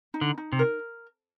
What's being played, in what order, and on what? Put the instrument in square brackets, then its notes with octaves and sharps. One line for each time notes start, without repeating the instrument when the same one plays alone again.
[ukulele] D#4
[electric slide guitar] D3
[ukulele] D#4
[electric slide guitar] C3
[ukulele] A#4